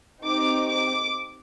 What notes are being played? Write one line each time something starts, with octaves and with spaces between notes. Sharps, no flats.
C4 D#4 G4 D6
D6